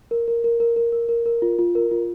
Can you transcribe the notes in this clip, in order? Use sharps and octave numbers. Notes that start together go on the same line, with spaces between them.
A#4
A#4
A#4
A#4
A#4
A#4
A#4
A#4
F4
F4
A#4
F4